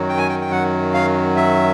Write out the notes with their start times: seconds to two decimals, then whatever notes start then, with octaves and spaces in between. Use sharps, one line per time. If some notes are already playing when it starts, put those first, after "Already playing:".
Already playing: F#2 D#3 F#3
0.09 G5
0.18 G#5
0.29 G5
0.41 G5
0.51 F#5
0.93 F5
1.36 E5